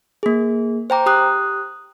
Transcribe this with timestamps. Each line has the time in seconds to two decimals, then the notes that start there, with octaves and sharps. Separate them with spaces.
0.23 A#3 G#4
0.90 C5 G5 A#5 D6
1.06 G4 D#6 F#6